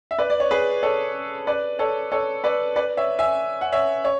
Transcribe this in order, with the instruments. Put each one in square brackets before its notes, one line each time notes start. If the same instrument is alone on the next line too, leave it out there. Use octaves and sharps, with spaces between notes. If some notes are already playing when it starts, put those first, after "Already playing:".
[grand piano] E5
B4 D5
D5
C#5
G#4 B4
A4 C#5
B4 D5
A4 C#5
A4 C#5
B4 D5
B4 D5
C#5 E5
E5 G#5
F#5
C#5 E5
C#5